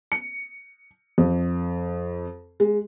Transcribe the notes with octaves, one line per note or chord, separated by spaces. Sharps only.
C#7
F2
G#3